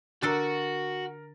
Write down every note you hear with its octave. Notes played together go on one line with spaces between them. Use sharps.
D3 D4 F#4 A4 A#4 A6